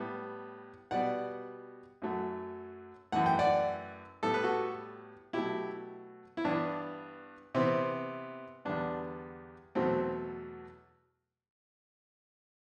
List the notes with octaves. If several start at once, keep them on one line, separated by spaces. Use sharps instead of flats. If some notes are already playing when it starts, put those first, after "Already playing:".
Already playing: A2 G3 B3
B2 G3 B3 D5 F#5
F#2 F#3 A3
F#2 E3 A3 F#5
G5
D5 F#5
A2 G3 B3 A4
B4
F#4 A4
B2 F#3 A3 E4 G4
E4
G2 E3 B3 D4
C3 E3 B3 C4
E2 D3 G3 B3 D4
E2 B2 F#3 A3 C4